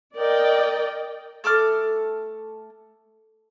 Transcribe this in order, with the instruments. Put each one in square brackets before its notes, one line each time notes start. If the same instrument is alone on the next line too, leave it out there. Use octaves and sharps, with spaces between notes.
[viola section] A#4 D5 D#5 G5
[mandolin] A3 A4 D6 F6